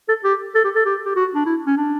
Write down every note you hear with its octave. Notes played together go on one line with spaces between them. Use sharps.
A4
G4
A4
G4
A4
G4
G4
F#4
D4
E4
C#4
D4